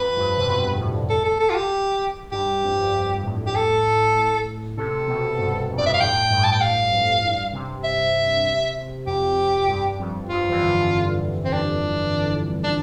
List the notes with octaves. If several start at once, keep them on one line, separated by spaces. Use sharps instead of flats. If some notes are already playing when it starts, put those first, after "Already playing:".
Already playing: F2 B4
G2
C3
B2
G2
A2
A4
A4
A4
F4
G4
G2 G4
F2
G2
F2
G2
G2
A2
G4
A4
C3 A4
B2
G2
F2
G2 D5
F2 E5
F5
A2 G5
G2
A2
G2 A5
G5
G2 F5
F2
G2
C3
E5
F2 G4
G2
F2
G2 F4
E3
D3
C4
D4
D4